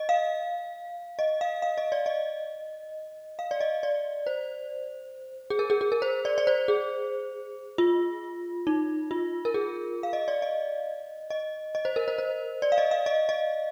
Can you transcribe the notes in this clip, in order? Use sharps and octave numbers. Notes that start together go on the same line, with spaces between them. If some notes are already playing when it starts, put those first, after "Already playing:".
Already playing: D#5
F5
D#5
F5
F5
D#5
D5
D#5
F5
D5
D#5
D5
C5
G#4
A#4
G#4
G#4
A#4
C5
D5
D5
C5
G#4
F4
D#4
F4
A#4
G#4
F5
D#5
D5
D#5
D#5
D#5
C5
A#4
C5
C5
D5
F5
D#5
F5
D#5
D#5